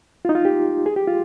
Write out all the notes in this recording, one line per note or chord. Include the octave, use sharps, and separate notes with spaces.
F4
D#4
F4
G4
G#4
G4
F4